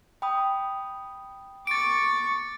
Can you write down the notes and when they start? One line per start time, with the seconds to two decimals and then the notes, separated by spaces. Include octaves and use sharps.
0.22 G5 B5 D#6
1.67 C#6 D6 A6 D7